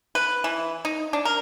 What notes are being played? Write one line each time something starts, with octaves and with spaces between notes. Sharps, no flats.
B4
E3
D#4
D4
A#4